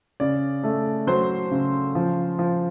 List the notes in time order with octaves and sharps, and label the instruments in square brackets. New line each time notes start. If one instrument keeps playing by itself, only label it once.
[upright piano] C#3 D5
A3
F#3 C5
C#3
F3
F3